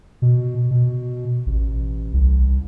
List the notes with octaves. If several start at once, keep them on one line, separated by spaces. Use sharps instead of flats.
B2
B2
A1
C2